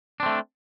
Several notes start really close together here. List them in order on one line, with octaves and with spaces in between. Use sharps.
D4 C4 A3